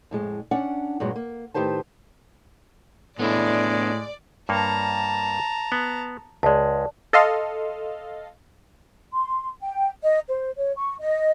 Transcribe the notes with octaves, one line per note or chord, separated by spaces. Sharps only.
F2 A2 G#3
C#4 D4 F#5
G2 A#2 F#3 G#3
A#3
A2 D#3 G4 B4 C5 A5
A2 G#3 B3 D4 E4 D5
G2 A#3 C#5 A5 A#5
B3
C#2 G#3 D5 A5
A4 D#5 F5 C6
C6
G5
D#5
C5
C#5
C#6
D#5